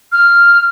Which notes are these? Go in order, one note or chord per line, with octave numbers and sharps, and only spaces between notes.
F6